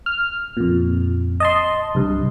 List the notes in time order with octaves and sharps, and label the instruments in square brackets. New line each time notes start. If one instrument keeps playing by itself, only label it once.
[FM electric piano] F6
F2 A#2
D#5 A5 C6
C2 G2